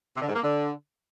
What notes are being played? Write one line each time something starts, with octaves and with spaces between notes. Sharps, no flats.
C3
D3
G#2
A#3
D3